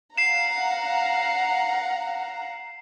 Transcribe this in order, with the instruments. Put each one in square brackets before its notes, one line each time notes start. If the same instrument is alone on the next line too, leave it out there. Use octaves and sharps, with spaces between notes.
[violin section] F5 F#5 A#5 [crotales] C7 E7